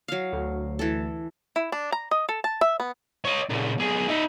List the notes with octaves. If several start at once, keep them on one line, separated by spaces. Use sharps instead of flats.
F#3 F5
D2 D3
E3 A4
E4
D4
A#5
D#5
A4
A5
E5
B3
C#5 D#5
A#2 C#3
B1 G#4
D#4 E5